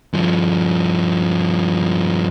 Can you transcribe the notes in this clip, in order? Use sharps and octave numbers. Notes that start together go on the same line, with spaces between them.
G2 F3